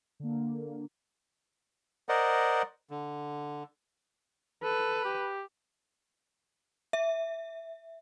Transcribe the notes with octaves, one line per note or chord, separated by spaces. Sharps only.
D3 A#3
A#4 C5 D5 D#5 F#5
D3
A4 B4
G4
E5